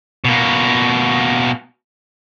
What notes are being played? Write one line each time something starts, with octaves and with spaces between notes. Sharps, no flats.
B2 A#3